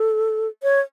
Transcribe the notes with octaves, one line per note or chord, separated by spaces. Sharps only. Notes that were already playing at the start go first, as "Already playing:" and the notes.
Already playing: A4
C#5